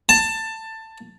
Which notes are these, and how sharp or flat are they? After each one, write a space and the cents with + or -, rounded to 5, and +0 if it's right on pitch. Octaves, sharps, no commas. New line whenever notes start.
A5 +15